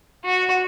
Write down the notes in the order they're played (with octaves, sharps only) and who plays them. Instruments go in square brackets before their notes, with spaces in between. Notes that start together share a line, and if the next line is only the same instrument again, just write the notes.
[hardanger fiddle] F#4